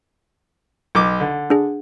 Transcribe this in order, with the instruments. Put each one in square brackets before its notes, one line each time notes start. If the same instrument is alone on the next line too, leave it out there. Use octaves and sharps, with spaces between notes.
[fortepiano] B1 D6
D3
[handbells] D4 G#4